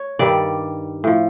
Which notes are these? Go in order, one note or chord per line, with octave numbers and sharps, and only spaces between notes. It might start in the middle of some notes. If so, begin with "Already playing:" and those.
Already playing: C#5
G2 D#3 G3 D5
A2 F3